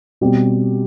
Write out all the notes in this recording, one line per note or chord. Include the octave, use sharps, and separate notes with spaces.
B2 G3 C4 G4